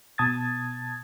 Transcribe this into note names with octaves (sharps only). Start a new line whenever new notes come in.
B2 A5 D#6 G#6 A6